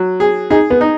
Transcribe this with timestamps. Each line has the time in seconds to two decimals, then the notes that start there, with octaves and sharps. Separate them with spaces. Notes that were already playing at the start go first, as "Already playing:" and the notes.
Already playing: F#3
0.20 G#4
0.50 D#4 G#4
0.70 B3
0.81 D#4